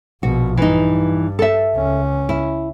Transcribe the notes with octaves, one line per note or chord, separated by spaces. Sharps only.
A#1 B2 F#4
G2 E3 D#4
A4 E5
C#2 C#4
E4